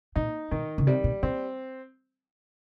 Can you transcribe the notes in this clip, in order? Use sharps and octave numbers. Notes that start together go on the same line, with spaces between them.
A#2 D#4
B2 D#3
C#3
C3 G3
B2
A#2 C4